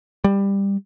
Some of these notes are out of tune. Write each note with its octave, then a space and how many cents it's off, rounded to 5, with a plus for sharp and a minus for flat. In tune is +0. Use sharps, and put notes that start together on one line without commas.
G3 +15